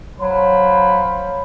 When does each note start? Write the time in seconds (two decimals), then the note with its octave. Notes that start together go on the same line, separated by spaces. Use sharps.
0.20 F#3 C5 F5 B5